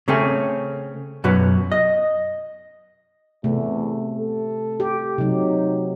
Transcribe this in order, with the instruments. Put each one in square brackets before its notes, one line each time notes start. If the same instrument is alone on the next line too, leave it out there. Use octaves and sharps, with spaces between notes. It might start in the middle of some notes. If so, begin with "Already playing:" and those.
[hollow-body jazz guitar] C#3 A3 C4 C#4
F#2 B2 F#3 B3
D#5
[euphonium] E2 [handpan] C3 A3
[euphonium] A4
[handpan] G4
[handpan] C3 F#3 [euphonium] D#4